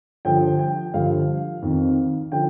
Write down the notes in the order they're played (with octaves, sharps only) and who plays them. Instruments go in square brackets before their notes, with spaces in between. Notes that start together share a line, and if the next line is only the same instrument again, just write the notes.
[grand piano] G2 D3 F3 G5
G5
G2 D3 F3 F5
F2 D#3
D3 F3 G5